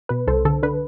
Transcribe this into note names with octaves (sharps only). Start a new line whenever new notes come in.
B2 B4
C2 A4 C5
D3 A4
D3 B4